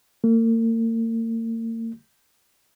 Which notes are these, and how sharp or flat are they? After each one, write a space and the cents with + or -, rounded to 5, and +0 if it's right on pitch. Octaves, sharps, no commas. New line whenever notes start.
A#3 -40